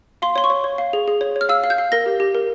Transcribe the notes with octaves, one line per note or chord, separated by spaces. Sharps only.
F5 C6
C#5 C6
C#6
C#5
C#5
F5
G#4
G#4
C#5
C#5
F6
F5 E6
F5
G6
F5
A#4 A#6
G4
G4
A#4